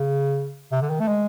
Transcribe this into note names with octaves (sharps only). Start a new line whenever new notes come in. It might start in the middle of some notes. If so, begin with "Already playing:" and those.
Already playing: C#3
C3
D3
D#3
A3
G#3